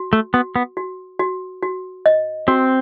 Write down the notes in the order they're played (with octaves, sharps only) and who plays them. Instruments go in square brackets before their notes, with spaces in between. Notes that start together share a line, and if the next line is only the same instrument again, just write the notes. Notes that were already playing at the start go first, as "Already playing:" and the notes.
Already playing: [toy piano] F#4
[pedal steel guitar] A3
[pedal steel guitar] B3 [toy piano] F#4
[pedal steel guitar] B3
[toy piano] F#4
F#4
F#4
D#5
[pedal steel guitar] C4 [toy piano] F#4